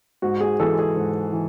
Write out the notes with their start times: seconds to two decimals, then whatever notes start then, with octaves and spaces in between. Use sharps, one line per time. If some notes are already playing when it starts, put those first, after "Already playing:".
0.22 G#2 F#4
0.41 G#4
0.60 E3 G#3 A4
0.79 G#4
0.96 G#2
1.33 E3